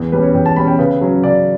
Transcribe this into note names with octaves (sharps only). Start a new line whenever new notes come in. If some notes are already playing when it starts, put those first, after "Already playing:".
Already playing: E2
B2 G3 C#4 B4
C#5
E2 G5
A5
B2 G3 C#4 B5
G5
C#3 B4
F#3 C#4
C#3 D5